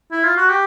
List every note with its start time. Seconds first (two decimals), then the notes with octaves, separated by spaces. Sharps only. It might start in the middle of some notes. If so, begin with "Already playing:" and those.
0.11 E4
0.24 F4
0.37 F#4
0.50 G4